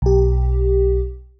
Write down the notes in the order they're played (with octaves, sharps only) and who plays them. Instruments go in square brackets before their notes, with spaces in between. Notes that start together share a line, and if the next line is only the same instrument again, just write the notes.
[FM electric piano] B1 G4